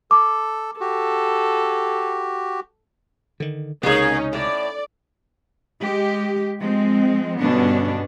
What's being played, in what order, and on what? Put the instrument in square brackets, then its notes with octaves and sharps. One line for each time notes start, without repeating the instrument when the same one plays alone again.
[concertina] A4 [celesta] D6
[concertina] F#4 G4 [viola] A4
[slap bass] D3 D#3
[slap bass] C#2 C3 [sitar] A#3 G#4 [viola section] C#4 D#4
[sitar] A2 [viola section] D5
[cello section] G#3 G4
F3 G#3 C4
G2 B2 D3 B3 C#4 D4